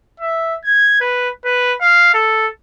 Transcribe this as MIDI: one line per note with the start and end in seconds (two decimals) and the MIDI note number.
0.20 0.56 76
0.64 0.97 92
1.01 1.29 71
1.45 1.73 71
1.81 2.14 77
2.14 2.47 69